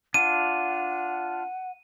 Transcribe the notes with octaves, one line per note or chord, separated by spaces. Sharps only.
D4 F4 F#5 D#7